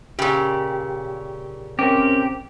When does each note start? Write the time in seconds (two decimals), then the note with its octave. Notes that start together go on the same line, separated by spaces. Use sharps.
0.19 A#2 C#3 G4
1.79 C4 C#4 G4 A#4